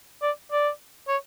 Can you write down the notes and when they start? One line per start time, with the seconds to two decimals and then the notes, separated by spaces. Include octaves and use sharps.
0.22 D5
0.52 D5
1.08 C#5